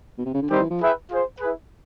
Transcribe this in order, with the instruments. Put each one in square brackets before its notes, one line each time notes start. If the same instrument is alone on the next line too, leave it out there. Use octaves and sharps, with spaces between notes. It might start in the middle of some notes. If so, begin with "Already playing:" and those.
[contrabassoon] B2
C3
C#3
D3
[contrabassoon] D#3 [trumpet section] G3 C4 D#4 G4 C5
[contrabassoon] E3
F3
[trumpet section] E4 G#4 B4 E5 G5
F4 G#4 C5
E4 G#4 B4